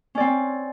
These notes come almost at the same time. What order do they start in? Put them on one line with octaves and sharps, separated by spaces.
C#4 D5 C4